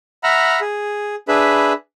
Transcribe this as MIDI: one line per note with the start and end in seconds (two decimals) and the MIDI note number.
0.24 0.60 76
0.24 0.60 78
0.24 0.60 82
0.24 0.60 83
0.24 0.60 89
0.61 1.15 68
1.28 1.73 62
1.28 1.73 68
1.28 1.73 71
1.28 1.73 76
1.28 1.73 83